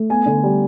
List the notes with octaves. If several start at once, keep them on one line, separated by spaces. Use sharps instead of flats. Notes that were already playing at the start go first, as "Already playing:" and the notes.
Already playing: A3
B3 G#5
D3
G3